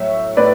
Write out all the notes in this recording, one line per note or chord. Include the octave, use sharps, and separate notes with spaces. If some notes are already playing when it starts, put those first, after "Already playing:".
Already playing: A2 F#3 C#5 E5
A2 B4 D5